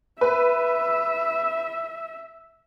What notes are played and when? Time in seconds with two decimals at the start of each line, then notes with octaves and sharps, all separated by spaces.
0.21 B4 E5